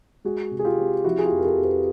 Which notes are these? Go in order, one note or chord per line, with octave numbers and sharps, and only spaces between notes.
G#3 F#4 G#4
C3
G#4
F4 G4
C4
F3 E4 F#4
G#4
F4 G4
F2
A#4
G4 A4
F2
A4 B4